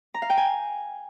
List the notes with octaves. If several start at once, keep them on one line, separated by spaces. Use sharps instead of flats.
A#5
F5
G5
G#5